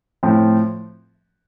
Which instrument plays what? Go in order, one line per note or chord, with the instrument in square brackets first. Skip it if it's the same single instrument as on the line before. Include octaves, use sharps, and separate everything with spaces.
[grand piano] A2 F3 C4